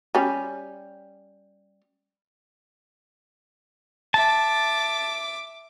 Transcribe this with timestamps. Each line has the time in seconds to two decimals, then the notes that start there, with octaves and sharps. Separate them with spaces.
0.15 G3 C#4
4.14 E5 A5 D6